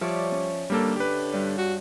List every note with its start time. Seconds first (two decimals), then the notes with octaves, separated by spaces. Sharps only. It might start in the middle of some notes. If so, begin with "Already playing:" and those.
0.01 F3 G3 C#5 D5 E5
0.32 C#4
0.70 D3 G3 A#3 A4
0.96 G4 B4
1.33 G2
1.58 F#4